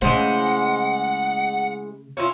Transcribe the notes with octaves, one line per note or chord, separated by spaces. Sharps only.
C#3 E3 G#3 A3 C5 F#5
C#4 E4 F4